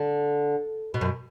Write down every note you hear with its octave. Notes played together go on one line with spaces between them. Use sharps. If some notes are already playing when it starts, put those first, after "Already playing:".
Already playing: D3
B2
F#2